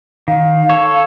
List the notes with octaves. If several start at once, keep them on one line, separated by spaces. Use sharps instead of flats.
D#3 F5
A4 C#5